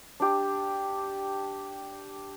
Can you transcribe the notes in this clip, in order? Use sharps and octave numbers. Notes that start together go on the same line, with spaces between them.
D4 G4